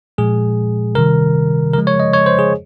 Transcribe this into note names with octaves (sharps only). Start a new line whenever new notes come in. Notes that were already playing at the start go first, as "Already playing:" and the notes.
A#2 F3 G#3 G#4
C3 D#3 G3 A#4
C#3 F3 G#3 A#4
C#5
D#5
C#5
C5
G#4